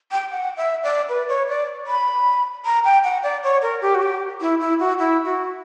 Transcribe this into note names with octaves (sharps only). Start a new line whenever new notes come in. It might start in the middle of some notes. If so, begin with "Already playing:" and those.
G5
F#5
E5
D5
B4
C#5
D5
B5
A#5
G5
F#5
D5
C#5
A#4
G4
F#4
G4
E4
E4
F#4
E4
F#4